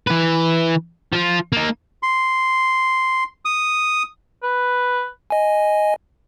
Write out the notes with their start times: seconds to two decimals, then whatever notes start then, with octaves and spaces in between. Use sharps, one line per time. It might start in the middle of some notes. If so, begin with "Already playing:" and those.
0.07 E3 B4
1.13 F3 F4
1.52 A#3 D#4
2.03 C6
3.45 D#6
4.43 B4
5.30 D#5 G#5